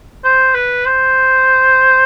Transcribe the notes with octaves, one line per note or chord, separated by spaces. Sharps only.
C5
B4
C5